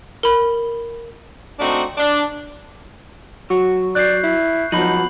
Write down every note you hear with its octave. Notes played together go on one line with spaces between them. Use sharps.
A#4 B5
A3 C4 D4 D#4 F#4
D4
F#3 F#4 C#6
D5 F#6 G6 C7
E4
F3 F#3 B3 D#4 B5 F#7